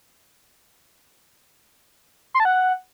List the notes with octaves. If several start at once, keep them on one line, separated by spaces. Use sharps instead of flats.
C6
A5
F#5